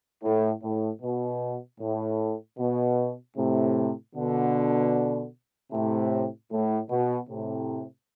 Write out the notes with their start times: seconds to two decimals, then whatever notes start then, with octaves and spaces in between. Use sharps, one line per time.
0.24 A2
0.63 A2
1.02 B2
1.81 A2
2.59 B2
3.37 A2 C3
4.16 B2 D3
5.72 A2 C3
6.52 A2
6.90 B2
7.29 A2 C3